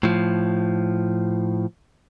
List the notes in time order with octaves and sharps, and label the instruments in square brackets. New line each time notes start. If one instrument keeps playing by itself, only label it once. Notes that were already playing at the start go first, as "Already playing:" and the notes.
[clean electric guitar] A2 F3